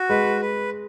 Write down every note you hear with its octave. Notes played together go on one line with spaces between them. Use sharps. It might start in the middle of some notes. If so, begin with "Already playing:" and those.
Already playing: F#4
G#3 B4
B4